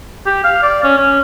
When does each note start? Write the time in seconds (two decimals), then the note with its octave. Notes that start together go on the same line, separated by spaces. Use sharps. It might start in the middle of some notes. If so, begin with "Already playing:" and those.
0.26 G4
0.44 F5
0.63 D5
0.84 C#4
0.97 C#4